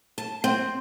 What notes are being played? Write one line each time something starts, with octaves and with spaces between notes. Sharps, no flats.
A5
C4